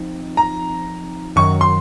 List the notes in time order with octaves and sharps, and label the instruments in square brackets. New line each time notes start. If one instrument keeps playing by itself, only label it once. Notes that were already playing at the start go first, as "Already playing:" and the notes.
Already playing: [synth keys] F3 C4 D#4
[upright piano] A#5
[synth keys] F#2 D#3 F#3 [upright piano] C#6
[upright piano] C6